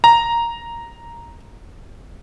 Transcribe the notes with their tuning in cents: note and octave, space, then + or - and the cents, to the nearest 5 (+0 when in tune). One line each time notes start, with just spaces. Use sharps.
A#5 +0